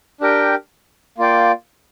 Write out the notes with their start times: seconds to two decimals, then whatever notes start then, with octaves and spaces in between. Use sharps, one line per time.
0.21 D4 G4 A#4 G5
1.18 A#3 F4 D5 G5